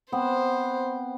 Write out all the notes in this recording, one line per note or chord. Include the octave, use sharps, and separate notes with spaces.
B3 C4 C5